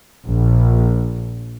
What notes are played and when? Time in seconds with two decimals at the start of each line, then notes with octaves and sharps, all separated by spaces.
0.25 A#1